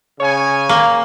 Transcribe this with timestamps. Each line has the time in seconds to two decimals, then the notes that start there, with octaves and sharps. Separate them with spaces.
0.20 C#3 C#5 G#5
0.69 A#3